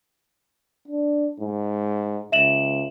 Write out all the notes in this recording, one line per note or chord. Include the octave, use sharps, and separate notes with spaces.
D4
G#2
C#2 E5 E7 F#7